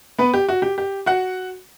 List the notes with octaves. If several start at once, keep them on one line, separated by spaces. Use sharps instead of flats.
B3 B4
G4
F#4
G4
G4
F#4 F#5